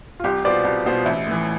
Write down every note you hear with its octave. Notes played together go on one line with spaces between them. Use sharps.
F4
C2 G4
B2 B3 F4 C5 D5
C2
B2 B3 F4 C5
A1 E5
A2 E3